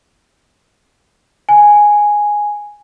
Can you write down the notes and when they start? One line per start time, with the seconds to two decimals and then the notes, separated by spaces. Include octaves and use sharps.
1.49 G#5